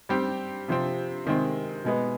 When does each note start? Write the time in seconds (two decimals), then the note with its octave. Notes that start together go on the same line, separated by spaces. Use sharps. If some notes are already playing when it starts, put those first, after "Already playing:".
0.09 G3 C4 G4
0.68 C3 F3 C4
1.25 C3 D#3 G#3 C4
1.85 B2 G#3 B3